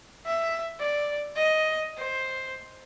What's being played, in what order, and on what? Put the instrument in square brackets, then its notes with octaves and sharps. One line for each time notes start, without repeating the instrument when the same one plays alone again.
[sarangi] E5
D5
D#5
C5